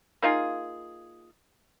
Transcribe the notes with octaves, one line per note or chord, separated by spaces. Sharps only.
A#3 D#4 F4 G#4